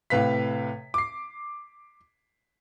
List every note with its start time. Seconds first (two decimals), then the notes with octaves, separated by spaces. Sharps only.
0.10 A2 C3 B4 F5 B6
0.94 D6 C7